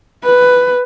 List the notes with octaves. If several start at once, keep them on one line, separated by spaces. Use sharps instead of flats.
B4